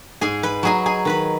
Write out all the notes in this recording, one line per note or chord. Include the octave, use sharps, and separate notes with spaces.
G#2 G#4 G#5
B4 B5
F#3 D#4 G#4 G#5
G#4 G#5
D#3 B4 B5